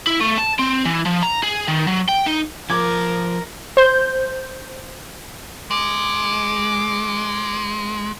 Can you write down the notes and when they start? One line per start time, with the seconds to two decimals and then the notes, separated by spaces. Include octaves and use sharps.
0.07 E4
0.21 A3
0.38 A5
0.59 C4
0.86 E3
1.06 F3
1.23 A#5
1.43 G#4
1.68 D#3
1.88 F#3
2.09 G5
2.27 D#4
2.70 F3 A#4 D6 G#6
3.77 C5 G6
5.71 G#3 D6